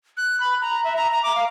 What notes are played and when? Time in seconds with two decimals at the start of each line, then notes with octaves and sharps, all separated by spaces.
0.17 F#6
0.40 B5
0.61 A#5
0.84 E5
0.96 A#5
1.12 A#5
1.23 D6
1.35 F5